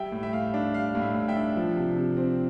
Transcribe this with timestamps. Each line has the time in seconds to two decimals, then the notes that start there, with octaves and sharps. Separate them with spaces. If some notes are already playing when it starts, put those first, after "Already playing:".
Already playing: G3 E5 G5
0.12 A2
0.23 E5
0.33 A2 F5
0.54 D4
0.74 G3 F5
0.95 A2
1.02 E5
1.15 A2
1.28 E5 G5
1.36 D4
1.56 F3
1.76 C3
1.96 C3
2.17 C4